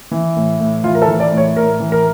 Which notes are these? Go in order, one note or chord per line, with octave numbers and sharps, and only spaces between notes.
E3
A2
A2
E3 F4
A#4
A4
E3
D5
A2
C#5
A2 A#4
E3
A#4